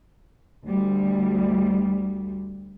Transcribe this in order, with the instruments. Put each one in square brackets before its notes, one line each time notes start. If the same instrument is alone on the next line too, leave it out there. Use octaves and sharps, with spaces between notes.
[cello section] D2 G3